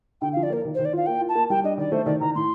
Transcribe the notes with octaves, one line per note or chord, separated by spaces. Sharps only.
D3 G5
F5
F3
D5
A#3 A#4
D#3
C5
D#3
D5
F4 F5
A#3 G5
F4
A5
A#3
G3 G5
D4 D#5
D#3 D5
A3 C5
D#3 D5
D#3 A#5
A2 C6